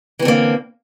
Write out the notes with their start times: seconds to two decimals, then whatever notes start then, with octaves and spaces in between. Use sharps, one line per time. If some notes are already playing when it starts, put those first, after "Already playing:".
0.19 E3
0.22 C4
0.25 D3
0.28 A#3